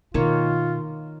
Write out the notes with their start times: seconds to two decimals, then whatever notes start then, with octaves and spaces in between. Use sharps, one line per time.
0.14 B2 D#3 A#3 F4 C#5